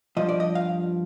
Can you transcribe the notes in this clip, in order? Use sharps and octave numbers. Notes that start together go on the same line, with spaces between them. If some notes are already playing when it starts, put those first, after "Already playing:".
G2 F3 D#5
D5
D#5
F5